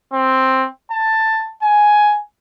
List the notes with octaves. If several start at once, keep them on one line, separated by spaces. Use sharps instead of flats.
C4
A5
G#5